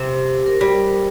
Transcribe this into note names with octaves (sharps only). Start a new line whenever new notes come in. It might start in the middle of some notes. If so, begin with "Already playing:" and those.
Already playing: C3 C5
A#4
G3